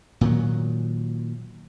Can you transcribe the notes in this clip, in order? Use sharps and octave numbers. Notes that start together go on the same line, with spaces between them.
A#2 D#3 F#3